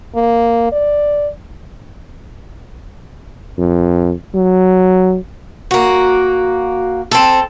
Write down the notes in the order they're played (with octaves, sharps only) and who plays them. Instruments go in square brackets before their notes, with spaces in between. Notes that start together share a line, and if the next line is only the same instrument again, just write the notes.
[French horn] A#3
D5
[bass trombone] F2
F#3
[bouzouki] A#3 F#4
C4 A4